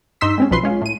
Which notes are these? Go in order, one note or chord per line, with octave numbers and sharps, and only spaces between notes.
G2 D#4 C6 E6 B6
G#3 C4 C#4
B1 F3 B4 C6
G#3 C#4 F4
A2 D#7